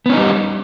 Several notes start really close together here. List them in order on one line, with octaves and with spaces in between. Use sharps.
B3 C#4 D#4 G3